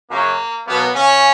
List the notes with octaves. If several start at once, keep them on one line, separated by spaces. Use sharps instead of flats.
F#2 C#3 F#3 A#3
B2 F#3 A#3 B3
C#3 C#4